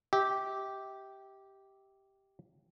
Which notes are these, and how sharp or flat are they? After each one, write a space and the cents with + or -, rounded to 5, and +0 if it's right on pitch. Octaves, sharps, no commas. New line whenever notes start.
G4 -5 E5 -40